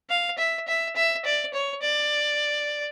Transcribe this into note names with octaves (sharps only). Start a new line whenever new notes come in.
F5
E5
E5
E5
D5
C#5
D5